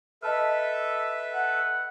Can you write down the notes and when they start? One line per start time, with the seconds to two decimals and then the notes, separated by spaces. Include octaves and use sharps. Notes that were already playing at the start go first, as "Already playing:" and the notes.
0.23 A4 B4 D#5 E5 A5 F6
1.34 F#5